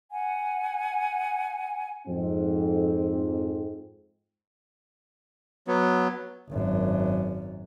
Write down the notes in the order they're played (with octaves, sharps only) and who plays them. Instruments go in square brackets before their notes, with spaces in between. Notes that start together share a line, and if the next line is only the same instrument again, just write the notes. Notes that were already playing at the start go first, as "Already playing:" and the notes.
[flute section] F#5 G#5
[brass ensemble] F2 G#2 C4
[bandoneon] F#3 B3
[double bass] G#1 F#2